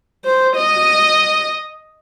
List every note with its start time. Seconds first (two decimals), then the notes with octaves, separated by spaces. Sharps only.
0.25 C5
0.56 D#5